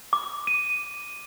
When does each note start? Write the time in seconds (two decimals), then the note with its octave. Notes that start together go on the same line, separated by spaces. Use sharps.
0.13 D6
0.47 D#7